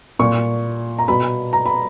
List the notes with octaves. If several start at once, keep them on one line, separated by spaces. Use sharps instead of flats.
A#2 C#6
A#5
B2 B5
A#5
B5